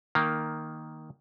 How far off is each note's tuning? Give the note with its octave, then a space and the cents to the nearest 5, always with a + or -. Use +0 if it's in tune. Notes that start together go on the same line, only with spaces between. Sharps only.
D#3 +0 A#3 +0